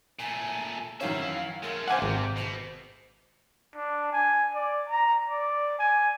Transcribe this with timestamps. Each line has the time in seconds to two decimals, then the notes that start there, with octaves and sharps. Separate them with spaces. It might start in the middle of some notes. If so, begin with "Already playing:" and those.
0.19 A#2 A3 G#5
1.01 F#2 D#3 E3 C#4 E5 F5
1.63 G#3 A3 A#4
1.88 F#2 A2 C5 F5 F#5 G#5 D6
2.02 G#1 C3
2.36 B2 C5
3.75 D4
4.12 G#5
4.54 D5
4.88 A#5
5.29 D5
5.79 G#5